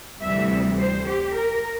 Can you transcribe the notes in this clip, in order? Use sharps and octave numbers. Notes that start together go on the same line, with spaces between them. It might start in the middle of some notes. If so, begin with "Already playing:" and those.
D2 C3 E3 G3 E5
C5
G4
A#4